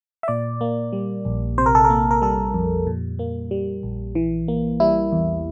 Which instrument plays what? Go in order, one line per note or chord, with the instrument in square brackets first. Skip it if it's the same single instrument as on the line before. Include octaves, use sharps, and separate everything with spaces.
[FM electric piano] E5
A#2 D5
A#3
G3
A#1
C3 C5
A#4
A4
A#4
A#3
A#4
G3 A4
F2
A#2
A#3
G3
A#1
E3
A#3
G3 E4
E2